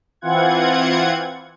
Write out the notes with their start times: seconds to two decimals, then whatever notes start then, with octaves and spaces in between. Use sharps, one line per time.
0.21 E3 C4 F4 F#5 G#6